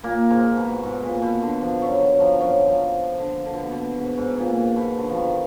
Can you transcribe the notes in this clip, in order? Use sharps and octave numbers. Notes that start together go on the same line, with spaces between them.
A#2 A#3
G#2 G#3
B2
G#2
A#2
B2
D3
F3
F#2 F#3
F#2 F#3
F3
F#2 F#3
F3
D3
D3
B2
D3
B2
G#2
G#2
A#2
G#2
B2
D3
F3
D#3